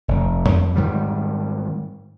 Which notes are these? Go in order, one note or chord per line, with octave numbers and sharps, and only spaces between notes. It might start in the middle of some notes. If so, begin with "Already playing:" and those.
F1
F2
G#2 D#3 G3